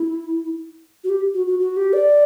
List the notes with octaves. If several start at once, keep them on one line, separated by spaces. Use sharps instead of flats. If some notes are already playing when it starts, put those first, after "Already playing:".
Already playing: E4
F#4
G4
F#4
F#4
F#4
G4
D5